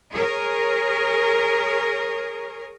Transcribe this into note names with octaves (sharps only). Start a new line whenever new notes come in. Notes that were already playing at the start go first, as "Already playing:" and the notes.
G#4 A#4 C#5